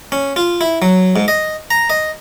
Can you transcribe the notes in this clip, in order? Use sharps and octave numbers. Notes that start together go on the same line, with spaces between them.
C#4
F4
E4
F#3
G#2
D#5
A#5
D#5